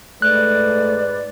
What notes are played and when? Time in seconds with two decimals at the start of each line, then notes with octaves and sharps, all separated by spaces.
0.22 G#2 A3 B4 D5 F#6